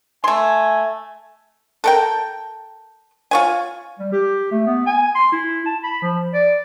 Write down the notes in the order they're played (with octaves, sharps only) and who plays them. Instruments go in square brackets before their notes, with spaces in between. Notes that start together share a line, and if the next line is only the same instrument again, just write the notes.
[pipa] A3 C6 [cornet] G#5
[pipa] A4 A#4 G5
F4 C#5 G#5
[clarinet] G3
G4
A3
B3
G#5
C6
E4
A5
B5
F3
D5